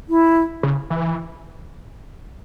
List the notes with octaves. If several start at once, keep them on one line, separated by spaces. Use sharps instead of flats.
E4
C#3
E3